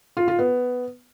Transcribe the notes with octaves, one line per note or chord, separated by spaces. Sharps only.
F4
F4
B3